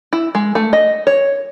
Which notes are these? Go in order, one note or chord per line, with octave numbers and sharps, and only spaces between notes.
E4
G#3
A3
D#5
C#5